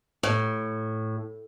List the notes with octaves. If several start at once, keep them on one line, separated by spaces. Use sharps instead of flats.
A2